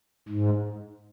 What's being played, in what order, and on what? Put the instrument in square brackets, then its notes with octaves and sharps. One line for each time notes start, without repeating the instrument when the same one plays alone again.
[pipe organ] G#2